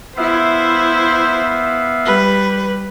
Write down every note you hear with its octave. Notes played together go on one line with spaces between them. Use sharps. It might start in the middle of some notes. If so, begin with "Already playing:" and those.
B3 E4 C5 E5 F5
G3 B4